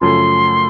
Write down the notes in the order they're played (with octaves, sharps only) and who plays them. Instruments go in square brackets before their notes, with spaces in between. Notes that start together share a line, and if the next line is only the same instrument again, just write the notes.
[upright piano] F#2 C#3 F3 A3 C#4 [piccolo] C6